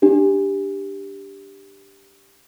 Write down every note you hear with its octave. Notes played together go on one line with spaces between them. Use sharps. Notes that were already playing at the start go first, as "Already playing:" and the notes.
D4 G4